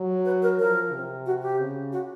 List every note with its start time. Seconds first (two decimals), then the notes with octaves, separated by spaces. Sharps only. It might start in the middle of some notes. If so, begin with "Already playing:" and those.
Already playing: F#3
0.25 B4
0.42 A#4
0.59 F3 A#4
0.93 C3
1.26 F#4
1.42 G4
1.59 C#3
1.92 F#4